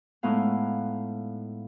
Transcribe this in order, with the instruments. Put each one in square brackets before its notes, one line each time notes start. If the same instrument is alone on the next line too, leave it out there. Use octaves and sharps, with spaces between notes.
[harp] A2 G#3 B3 D#4 F5